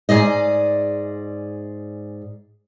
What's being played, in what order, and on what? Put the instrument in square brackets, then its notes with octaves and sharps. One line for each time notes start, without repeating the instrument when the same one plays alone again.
[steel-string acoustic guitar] G#2 G#4 D5 D#5